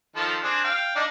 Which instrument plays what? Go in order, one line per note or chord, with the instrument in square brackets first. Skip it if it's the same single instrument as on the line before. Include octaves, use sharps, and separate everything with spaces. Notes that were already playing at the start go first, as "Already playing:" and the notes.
[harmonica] D#3 F3 A4
C4 D4 G#4
F5 G5
D4 D#4 D5